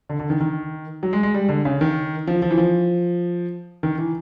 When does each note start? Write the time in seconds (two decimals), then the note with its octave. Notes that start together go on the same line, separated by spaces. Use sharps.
0.09 D3
0.20 D3
0.30 D#3
0.41 D#3
1.03 F#3
1.13 G#3
1.23 G#3
1.34 G3
1.49 D3
1.65 C#3
1.81 D#3
2.27 F3
2.42 F3
2.51 E3
2.58 F3
3.83 D#3
3.98 E3